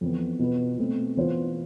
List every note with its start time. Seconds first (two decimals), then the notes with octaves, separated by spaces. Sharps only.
0.01 F2 E3 B3
0.39 B2 B3 F4 B4
0.78 B2 A3 C4
1.17 E3 B3 F4 C5